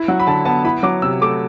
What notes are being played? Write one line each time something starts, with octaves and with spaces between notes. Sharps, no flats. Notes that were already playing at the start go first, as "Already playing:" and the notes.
Already playing: E4
F#3 F#5
B5
D3 A5
B3 A5
E4 B5
F#3 D6
C3 E6
A3 D6